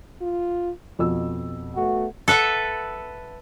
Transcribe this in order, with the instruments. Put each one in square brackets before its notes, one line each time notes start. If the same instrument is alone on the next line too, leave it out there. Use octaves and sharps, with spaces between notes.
[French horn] F4
[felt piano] F2 B2 E6
[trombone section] A3 B3 F#4
[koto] A4 B4 E5 F#5